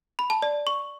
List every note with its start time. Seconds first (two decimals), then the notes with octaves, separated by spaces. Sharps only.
0.19 B5
0.30 A5
0.42 D5
0.67 C#6